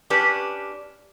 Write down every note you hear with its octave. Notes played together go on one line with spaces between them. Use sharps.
C#4 D4 G4 B4